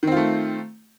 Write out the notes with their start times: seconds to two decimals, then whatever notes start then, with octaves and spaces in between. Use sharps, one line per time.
0.03 D#3
0.07 C4
0.12 F4
0.17 A3